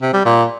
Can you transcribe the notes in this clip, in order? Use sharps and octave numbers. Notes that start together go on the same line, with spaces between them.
C3
G3
A#2